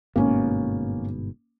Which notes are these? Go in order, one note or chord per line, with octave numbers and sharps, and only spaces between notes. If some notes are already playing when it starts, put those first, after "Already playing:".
G1 G#2 B2 A#3 C#4